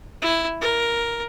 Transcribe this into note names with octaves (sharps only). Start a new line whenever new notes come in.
E4
A#4